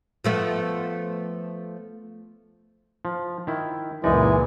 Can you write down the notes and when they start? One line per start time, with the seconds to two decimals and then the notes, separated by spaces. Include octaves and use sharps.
0.24 F3 A3 B3
3.05 F3
3.47 D#3 E4
4.04 C#2 F#2 A#2 E3 G#3 D#4 D5